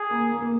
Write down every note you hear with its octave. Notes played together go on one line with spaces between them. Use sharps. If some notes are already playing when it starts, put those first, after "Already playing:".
Already playing: G#4
A#3
A#3
A#3